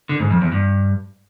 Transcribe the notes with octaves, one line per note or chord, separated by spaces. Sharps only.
D3
G#2
F2
E2
G2